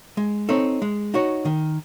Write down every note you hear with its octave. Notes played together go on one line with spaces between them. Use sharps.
G#3
C4 D#4 A4 C#5
G#3
D#4 F#4 C#5
D#3